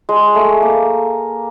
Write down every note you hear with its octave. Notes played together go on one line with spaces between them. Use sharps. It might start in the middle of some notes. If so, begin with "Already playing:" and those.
G#3
A3
A#3